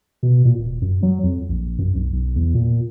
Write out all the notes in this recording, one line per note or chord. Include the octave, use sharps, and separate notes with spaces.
B2
A#2
D#1
F#2
F#3
F2
A#1
F#2
B1
B1
E2
A#2